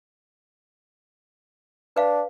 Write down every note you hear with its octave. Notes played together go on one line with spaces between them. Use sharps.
D4 B4 F5